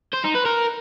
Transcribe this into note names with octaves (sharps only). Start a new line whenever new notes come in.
C5
D#4
B4
A#4